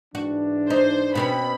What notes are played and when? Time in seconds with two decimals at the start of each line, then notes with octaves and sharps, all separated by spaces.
0.15 G#2 E3 D4 F#4
0.70 D#4 C5
1.15 B2 C4 C#4 B5